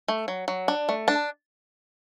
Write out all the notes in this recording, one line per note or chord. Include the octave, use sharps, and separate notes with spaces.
A3
F#3
F#3
D4
A3
D4 A5